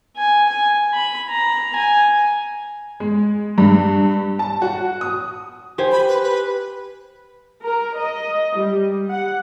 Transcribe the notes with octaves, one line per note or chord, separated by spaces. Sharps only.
G#5
G#5
B5
A#5
G#5
G#3
G2
A5
F#4
D#6
G4 C5 G#5
B5
B4
B4
A#4
D#5
G3
F#5